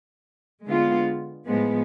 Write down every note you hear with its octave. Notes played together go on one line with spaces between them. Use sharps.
D3 G#3 B3 F4
A2 F3 G#3 B3